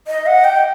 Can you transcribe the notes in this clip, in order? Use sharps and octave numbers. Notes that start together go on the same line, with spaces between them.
D#5
F#5
G5